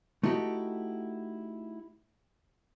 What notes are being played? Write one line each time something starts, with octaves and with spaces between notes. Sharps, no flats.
A3 D#4 E4 F#4 G4